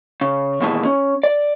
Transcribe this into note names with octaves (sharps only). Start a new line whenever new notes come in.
C#3
D#2 B2 E3 G#3 A5
C#4
D5